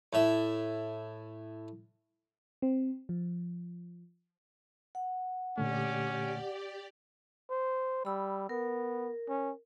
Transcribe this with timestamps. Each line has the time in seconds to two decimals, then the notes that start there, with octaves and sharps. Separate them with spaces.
0.13 A2 E5
2.62 C4
3.09 F3
4.95 F#5
5.58 A#2 D3 A3 C#4 G4 D5
7.50 C5
8.05 G3 B5 E6
8.49 B3 A#4
9.29 C#4